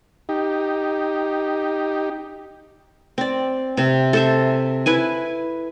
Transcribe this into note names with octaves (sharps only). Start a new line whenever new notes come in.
D#4 G4
C4 D5
C3 C4
A4 C5 E5
E4 B4 G#5